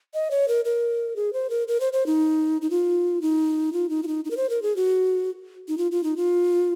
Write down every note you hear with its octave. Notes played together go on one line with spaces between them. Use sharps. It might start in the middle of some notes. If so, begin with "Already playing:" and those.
D#5
C#5
A#4
A#4
G#4
C5
A#4
A#4
C5
C5
D#4
D#4
F4
D#4
F4
D#4
F4
D#4
D#4
A#4
C5
A#4
G#4
F#4
D#4
F4
F4
D#4
F4